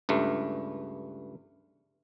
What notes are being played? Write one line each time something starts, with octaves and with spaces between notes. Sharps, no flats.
C#2 G2 A3